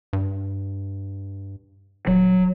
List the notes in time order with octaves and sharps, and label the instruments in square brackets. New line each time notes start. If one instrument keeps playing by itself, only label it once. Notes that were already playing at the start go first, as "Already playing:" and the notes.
[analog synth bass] G2
[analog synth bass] D#1 [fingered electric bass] F#3